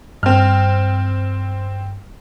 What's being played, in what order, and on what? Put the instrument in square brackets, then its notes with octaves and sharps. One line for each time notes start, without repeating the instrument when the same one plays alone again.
[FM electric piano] G2 [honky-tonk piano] C4 F6